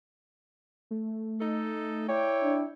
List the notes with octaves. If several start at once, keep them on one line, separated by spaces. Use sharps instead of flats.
A3
D#4 A4
E4 C#5 D5 G5
D4